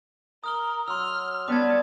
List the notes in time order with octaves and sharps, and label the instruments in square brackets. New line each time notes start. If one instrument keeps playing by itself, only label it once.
[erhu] A#4 [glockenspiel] D#6 F6 G7
[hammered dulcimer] F#3 [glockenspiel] C6 E6 [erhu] F6
[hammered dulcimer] G3 D4 [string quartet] B3 [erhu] A5 [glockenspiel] D6 G#6